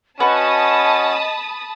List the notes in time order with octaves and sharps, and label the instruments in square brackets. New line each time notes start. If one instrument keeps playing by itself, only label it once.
[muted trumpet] C#4 [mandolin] F#4 B4 [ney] D#5 [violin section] A5 B5 D#6